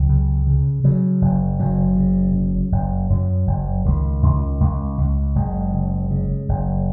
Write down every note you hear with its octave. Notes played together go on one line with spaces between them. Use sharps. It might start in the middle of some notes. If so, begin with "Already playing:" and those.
Already playing: C#2 F#3
C#3
C#3
C#3 F#3
F#1
F#1 F#3
C#3
C#3
F#1
F#2 F#3
F#1
C#2 D#3
C#2
C#2
C#2
F#1 G#3
C#3
C#3
F#1